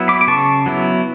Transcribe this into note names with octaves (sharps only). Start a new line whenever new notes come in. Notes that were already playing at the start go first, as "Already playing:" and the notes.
Already playing: F#3 B3 E4
B5 D6
D6
C#3 A5 C#6
F#3 B3 E4